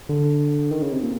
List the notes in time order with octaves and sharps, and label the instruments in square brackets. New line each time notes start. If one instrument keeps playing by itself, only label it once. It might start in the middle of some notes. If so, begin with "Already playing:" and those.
[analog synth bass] D3
D#3
C#3
C3
A#2